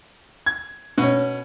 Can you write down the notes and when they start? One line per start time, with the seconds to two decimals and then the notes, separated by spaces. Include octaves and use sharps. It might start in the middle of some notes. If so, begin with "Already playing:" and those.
0.46 G#6
0.98 B2 C#4